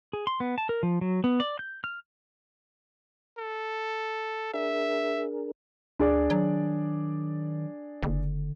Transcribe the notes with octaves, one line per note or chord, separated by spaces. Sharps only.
G#4
C6
B3
A5
A#4
F3
F#3
B3
D5
G6
F6
A4
D4 G#4 A#4 E5
D2 D4 G#4 D5
D#3 F#3
F#1 D3